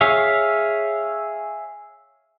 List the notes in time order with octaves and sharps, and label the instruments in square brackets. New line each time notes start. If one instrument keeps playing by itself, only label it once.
[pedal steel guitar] G#4 C#5 E5 F5